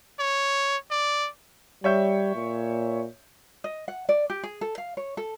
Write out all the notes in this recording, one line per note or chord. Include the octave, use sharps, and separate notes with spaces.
C#5
D5
G3 C#5 E5 G6
A#2
D#5
F#5
D5
G4
G#4
A4
F5
C#5
A4